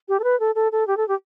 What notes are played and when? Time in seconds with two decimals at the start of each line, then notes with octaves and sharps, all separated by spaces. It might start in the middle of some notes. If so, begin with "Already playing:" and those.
0.09 G4
0.20 A4
0.24 B4
0.40 A4
0.55 A4
0.72 A4
0.87 G4
0.97 A4
1.08 G4